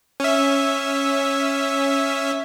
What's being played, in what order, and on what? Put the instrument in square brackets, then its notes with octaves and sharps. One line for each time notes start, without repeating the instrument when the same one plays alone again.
[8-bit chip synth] C#4 E5